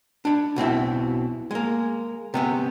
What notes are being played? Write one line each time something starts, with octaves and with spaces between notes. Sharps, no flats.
D4 B5
B1 B2 C4 E4
G#3 A#3
C3 B3 C#4